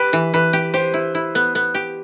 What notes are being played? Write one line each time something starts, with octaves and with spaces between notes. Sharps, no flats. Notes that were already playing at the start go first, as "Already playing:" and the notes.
Already playing: G4 B4
E3
E3 B4
G4
G4 C5
E4
E4
B3
B3
G4